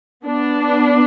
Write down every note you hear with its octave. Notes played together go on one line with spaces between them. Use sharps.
B3 D4